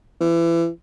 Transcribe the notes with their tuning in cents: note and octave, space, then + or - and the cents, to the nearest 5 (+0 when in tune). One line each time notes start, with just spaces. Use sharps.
E3 +30